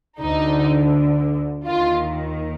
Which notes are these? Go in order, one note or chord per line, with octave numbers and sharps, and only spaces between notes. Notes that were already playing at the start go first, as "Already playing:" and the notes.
D2 D3 D#4
D#2 D#3 F4